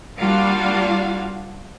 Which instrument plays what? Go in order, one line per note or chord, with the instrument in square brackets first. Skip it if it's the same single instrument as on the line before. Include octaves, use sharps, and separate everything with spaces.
[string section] G3 A#3 D4 F4 F#4 F5